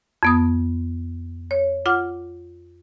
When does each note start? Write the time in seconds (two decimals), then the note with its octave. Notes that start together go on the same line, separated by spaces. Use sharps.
0.23 F2 B3 D#6
1.51 C#5
1.86 F4 F#5 D6 F6